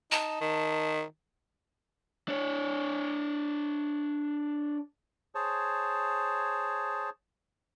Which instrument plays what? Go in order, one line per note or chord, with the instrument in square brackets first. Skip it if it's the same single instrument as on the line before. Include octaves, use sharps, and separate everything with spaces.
[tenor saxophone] D#4 [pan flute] A5
[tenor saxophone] D#3
[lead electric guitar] D4 C#5
[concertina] G#4 C5 C#5 A5